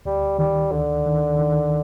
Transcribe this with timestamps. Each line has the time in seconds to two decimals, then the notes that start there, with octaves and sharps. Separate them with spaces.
0.05 D2 G3
0.39 D#3 G3
0.71 D2 D3
1.06 D#3
1.39 D#3